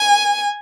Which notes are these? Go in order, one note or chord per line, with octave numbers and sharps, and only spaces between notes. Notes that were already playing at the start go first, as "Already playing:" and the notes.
Already playing: G#5